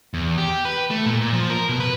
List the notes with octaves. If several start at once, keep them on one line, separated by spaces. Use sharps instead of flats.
E2
G4
B4
A3
A#2
A#2
F3
A#4
B2
B4